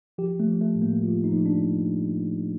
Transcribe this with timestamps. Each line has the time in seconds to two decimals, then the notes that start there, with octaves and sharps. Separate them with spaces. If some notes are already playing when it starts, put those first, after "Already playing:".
0.18 F3 G4
0.40 A3
0.47 F3
0.61 A3
0.75 A2
0.82 A#3
1.03 F3 F4
1.24 D#4
1.32 F3
1.46 D4